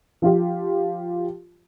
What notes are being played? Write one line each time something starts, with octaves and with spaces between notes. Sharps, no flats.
F3 F4 G4